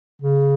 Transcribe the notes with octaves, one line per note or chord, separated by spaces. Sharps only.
C#3